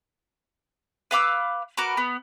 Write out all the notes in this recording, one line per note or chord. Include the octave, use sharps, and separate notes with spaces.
B4 F5 D6 E6
F#4 A#4 B4 D6
B3